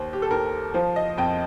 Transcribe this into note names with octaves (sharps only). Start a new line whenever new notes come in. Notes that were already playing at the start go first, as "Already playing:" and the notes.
Already playing: D#2 C5
G4
A4
D#2 A#4
F3 C5
D#5
F2 G5